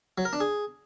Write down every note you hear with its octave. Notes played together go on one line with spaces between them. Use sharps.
F#3
A#4
D4
G#4